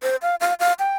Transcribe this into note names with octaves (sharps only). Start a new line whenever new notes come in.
C5
F5
F5
F5
G5